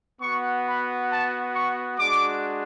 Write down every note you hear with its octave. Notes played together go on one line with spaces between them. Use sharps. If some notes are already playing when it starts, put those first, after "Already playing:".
B3 F#4 C#6
B5
A5
C#6
G#3 D4 F#4 D6